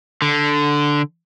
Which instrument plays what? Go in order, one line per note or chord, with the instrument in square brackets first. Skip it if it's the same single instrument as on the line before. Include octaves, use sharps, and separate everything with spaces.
[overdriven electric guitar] D3